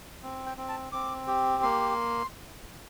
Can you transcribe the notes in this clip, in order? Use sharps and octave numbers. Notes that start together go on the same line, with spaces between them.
C4
G5
C4
A5
C4 D6
G4
A#3 C6